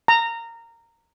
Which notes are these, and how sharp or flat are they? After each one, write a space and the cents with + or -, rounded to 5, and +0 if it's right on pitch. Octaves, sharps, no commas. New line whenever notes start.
A#5 -15